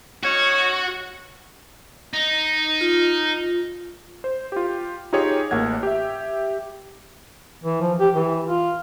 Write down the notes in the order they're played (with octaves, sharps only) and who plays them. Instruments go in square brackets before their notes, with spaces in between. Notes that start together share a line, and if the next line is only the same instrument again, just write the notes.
[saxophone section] C#4 D#4 C#5 [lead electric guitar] F#4
[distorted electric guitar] D#4
[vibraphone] F4
[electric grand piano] C5
F4 G4
D#4 F4 G4 G#4 C#5
A1 A#3 F#5 G#6
G4 E5
[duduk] E3
F3
G4
E3
F4